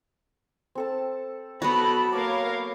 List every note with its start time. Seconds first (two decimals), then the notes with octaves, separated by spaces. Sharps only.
0.75 C4 A4 A5
1.62 F#3 B3 F#4 A4 B4 A5 B5 C6
2.13 A#3 A#4 C#5 F5 D6